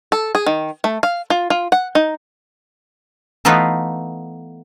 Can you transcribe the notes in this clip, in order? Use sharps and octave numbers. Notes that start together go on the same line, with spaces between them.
A4
G#4
D#3
A3
F5
F4
F4
F#5
D#4
E3 A3 B3 D#4 F4 B4